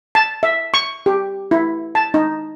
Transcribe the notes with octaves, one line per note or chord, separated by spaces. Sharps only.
A5
E5
C#6
G4
E4
A5
D#4